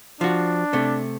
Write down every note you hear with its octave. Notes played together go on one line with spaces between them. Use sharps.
F3 D4 F#4
C3 A3